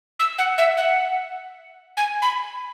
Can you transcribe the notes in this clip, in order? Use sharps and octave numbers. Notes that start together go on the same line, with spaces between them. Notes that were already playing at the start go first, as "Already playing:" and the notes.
E6
F#5
E5
F#5
G#5
B5